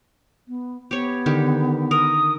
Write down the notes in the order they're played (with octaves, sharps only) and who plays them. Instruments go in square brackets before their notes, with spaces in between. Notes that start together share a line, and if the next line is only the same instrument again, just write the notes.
[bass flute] B3
[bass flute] B3 [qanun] G4 C#5
[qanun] D3 D#3 G4
[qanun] A#4 [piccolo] D#6